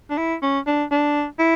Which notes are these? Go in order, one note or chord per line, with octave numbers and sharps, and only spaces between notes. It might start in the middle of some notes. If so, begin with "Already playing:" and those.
D4
E4
C#4
D4
D4
E4